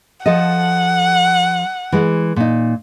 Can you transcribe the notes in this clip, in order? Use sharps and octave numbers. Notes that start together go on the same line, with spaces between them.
F3 A4 D#5 F#5
E3 G#3
A#2 D#4